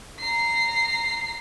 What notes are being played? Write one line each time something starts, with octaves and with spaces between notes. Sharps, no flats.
A#5 C7